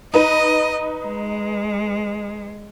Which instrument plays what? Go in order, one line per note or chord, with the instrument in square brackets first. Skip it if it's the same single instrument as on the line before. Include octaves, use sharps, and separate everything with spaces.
[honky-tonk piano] D#4 B4 [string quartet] D#5
[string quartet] G#3